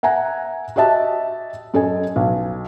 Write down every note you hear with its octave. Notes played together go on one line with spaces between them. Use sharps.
E5 F#5 G#5 A#5
F#4 G4 D#5 E5 A5
F#2 A4 D#5 G#5
B1